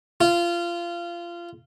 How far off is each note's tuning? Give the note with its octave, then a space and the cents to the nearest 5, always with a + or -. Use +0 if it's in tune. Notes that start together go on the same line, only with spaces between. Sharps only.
F4 -20